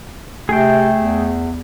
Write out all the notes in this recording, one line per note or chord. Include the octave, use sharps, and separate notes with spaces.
C3 A3 G#4 G5
E2